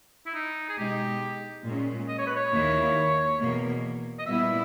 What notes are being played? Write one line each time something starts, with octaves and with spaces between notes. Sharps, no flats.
E4
D#4
G#4
B2 G#3 D#4 G4
A#2 G#3 C#4
D#5
C#5
B4
C#5
D#2 D#3 A#3 E4
E2 B2 A#3
D#5
A#2 G3 B3 E4 E5